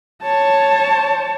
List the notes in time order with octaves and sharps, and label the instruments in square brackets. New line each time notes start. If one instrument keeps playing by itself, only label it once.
[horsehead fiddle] C#5 A5